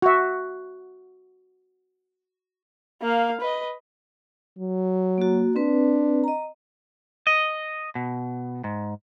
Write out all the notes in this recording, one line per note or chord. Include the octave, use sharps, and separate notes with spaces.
F#4 E5
A#3 F5
B4 D#5
F#3
A#3 F#4
C4 D4 B4
D#5 A#5
D#5
B2
G#2